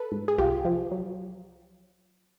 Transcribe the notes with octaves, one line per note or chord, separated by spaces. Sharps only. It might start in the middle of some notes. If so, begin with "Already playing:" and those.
Already playing: A4 B4
G#2
G#4
C2 F4 G4
F3
F#3